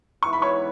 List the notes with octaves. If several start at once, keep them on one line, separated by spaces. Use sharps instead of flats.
G#2 E3 B3 E4 C#6
B5
C#5 C#6